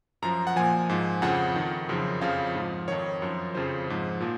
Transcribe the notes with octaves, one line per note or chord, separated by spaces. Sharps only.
F#2 F3 A#5
F#5
A#2 F3 G#5
G#2 F3
F2 C#3 F3 F#5
D#3
F2
F#2 C#3 F3
F2 C#3 F3 F5
G#2 F3
F2 D#3 C#5
F#2 F3
F2 C#3 F3 C5
G#2 F3
A#2 F3